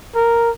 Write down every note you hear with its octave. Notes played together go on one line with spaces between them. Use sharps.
A#4